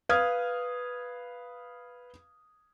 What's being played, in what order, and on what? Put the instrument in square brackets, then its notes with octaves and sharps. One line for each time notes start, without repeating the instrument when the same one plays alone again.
[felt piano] B4 F5 D#6 F6 G#6